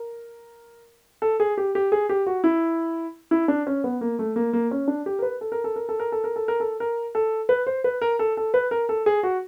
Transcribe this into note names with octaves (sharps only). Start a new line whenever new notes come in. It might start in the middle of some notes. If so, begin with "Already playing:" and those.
Already playing: A#4
A4
G#4
G4
G4
G#4
G4
F#4
E4
E4
D4
C#4
B3
A#3
A3
A#3
A#3
C#4
D4
G4
A#4
B4
A4
A#4
A4
A#4
A4
A#4
A4
A#4
A4
A#4
A4
A#4
A4
B4
C5
B4
A#4
A4
A4
B4
A#4
A4
G#4
F#4